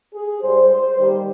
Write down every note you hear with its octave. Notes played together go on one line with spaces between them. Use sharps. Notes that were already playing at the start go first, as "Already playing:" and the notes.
G#4
G#2 G3 C5
C5
D#2 D#3 G3 G4